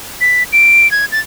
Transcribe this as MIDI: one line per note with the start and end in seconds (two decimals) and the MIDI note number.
0.21 0.43 95
0.52 0.90 98
0.91 1.05 92
1.12 1.20 93